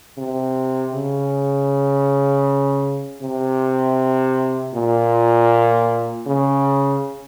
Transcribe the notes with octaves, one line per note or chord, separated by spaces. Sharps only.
C3
C#3
C3
A#2
C#3